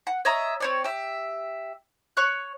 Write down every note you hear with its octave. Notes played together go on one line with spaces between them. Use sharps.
F#5
C#5 D#5 E5 A#5
C4 C#5 D5
G4 E5
C#5 C#6 F#6